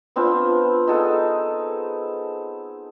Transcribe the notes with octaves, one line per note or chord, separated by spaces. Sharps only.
B3 C4 D4 F4
D#4 G#4 A4 F#5